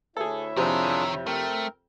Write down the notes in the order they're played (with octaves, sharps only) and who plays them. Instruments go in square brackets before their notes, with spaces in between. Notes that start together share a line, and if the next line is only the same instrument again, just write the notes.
[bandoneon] D2 [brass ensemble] E4 C#5 E5 [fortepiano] G#4 A4
[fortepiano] F2 C3 [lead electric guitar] D#3 A#4 [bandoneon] D4 F4 G#4
[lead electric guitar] A3 [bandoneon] C4 A#4